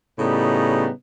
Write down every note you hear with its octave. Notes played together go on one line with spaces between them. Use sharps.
A2 C#3 G3 B3 D#4